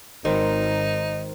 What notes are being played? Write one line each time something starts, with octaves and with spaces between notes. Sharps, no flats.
G#1 D#3 D#4 A#4 C5